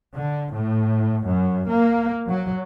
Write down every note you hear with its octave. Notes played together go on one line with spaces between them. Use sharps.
D3
A2
F#2
A#3
F#3